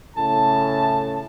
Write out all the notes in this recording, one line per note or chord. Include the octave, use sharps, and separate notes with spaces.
A2 C#3 A5